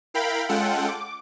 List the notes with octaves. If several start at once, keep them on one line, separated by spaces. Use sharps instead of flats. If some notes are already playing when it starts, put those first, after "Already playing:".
E4 A#4 F5 G5 B5
G#3 C#4 F4 A4 F#5 G5
D6